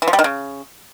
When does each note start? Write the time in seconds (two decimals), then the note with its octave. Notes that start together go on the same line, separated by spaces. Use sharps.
0.02 E3
0.08 F3
0.13 G3
0.19 D#3
0.24 C#3